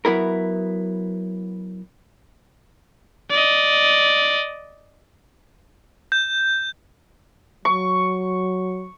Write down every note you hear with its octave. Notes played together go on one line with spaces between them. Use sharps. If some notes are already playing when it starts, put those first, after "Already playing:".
F#3 B3 E4 A#4
D5 D#5
G6
F#3 C#6